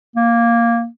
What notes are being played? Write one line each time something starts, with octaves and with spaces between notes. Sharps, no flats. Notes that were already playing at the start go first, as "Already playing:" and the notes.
A#3